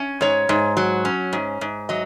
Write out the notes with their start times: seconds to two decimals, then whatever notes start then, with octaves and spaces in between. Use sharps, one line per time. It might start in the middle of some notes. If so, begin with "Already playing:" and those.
Already playing: C#4
0.21 G#2 C#5
0.49 G#2
0.77 F#3
1.05 C#4
1.33 G#2
1.61 G#2
1.89 F#3 D#5